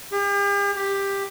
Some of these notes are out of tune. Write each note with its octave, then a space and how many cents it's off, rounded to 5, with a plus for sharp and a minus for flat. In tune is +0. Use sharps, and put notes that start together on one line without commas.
G4 +45
G4 +10